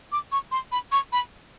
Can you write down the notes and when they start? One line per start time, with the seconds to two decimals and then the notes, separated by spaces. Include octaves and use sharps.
0.12 D6
0.32 C#6
0.52 C6
0.72 B5
0.92 C#6
1.12 B5